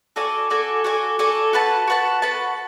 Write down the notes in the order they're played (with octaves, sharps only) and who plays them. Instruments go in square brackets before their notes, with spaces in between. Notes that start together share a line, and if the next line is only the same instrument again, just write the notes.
[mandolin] F#4 A4 D5 G#5
F#4 A4 D5 G#5
F#4 A4 D5 G#5
F#4 A4 D5 G#5
F#4 B4 F#5 A5
F#4 B4 F#5 A5
F#4 B4 F#5 A5